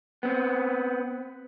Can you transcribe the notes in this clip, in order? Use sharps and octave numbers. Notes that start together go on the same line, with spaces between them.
B3 C4